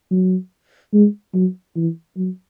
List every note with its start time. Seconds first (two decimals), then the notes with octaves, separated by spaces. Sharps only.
0.11 F#3
0.93 G#3
1.34 F#3
1.76 E3
2.17 F#3